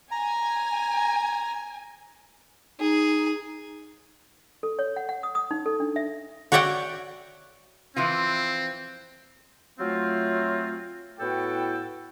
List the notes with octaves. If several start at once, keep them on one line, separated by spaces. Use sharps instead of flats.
G#5 A#5
D#4 G#4
A4
C#5
F#5
F#5
D#6
D#6
D#4
A4
D4
E5
F#4 C#5 D5 E5 F#5 G5
E3 F3 C4 F4
F#3 A3 C4 F4
A2 B3 E4 F#4 A4 G5